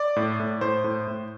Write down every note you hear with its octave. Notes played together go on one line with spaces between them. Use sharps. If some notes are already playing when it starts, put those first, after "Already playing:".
Already playing: D5
A2
A2
A2 C5
A2
A2